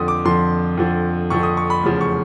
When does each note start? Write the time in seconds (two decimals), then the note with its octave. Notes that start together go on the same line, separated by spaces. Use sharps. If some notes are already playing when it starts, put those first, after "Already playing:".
Already playing: F2 D3 F3 D#6
0.08 D6
0.25 F2 D3 F3 C6
0.77 F2 D3 F3
1.30 F2 D3 F3 C#6
1.43 D#6
1.57 C#6
1.70 B5
1.83 F1 E2 C#3 F3
2.01 C#6